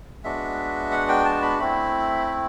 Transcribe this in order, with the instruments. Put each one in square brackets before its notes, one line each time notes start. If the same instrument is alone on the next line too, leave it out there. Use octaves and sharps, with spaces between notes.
[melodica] G#3 B3 D4 F#4 E5
F#5
G5
A5
B5
A3 C4 E4 B5
B5